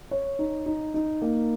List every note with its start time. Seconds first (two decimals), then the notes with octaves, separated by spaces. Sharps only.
0.11 C#5
0.39 D#4
0.66 D#4
0.94 D#4
1.22 A#3